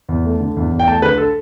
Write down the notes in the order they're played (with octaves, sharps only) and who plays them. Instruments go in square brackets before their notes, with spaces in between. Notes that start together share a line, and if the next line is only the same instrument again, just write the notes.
[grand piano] E2
A3
D3
E2
E2
G5
A3 A5
D3 B4
A4